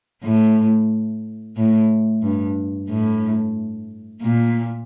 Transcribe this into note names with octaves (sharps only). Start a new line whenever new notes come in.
A2
A2
G2
A2
A#2